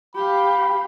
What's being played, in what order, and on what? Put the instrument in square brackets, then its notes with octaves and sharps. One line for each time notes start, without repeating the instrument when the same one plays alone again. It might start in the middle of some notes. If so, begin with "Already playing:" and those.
[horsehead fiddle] G4 F5 [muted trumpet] B5